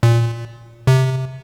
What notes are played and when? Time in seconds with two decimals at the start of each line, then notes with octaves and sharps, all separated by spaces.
0.03 A#2
0.87 C3